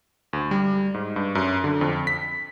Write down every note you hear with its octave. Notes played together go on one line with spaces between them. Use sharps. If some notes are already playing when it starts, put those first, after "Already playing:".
D2
G3
G#2
G2
F#2
D3
F2
B6